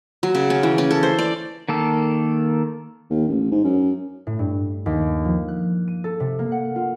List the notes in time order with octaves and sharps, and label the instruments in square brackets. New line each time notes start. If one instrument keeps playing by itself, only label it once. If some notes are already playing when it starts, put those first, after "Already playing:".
[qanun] F#3
C#3
C#4
E3
C#4
A4
C5
D5
[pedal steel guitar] D#3 A#3 A4
[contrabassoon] D#2
A1
G#2
F#2
[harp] A2
G2
D#2
F3
F#6
D#7
A4
C3
A#3
F#5
F4